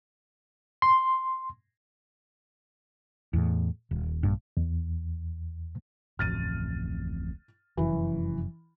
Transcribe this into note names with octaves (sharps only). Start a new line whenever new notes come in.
C6
E2 A2
D#1
A#1 G2
E2
D1 A1 F2 F6 A6 D#7
F1 F#2 E3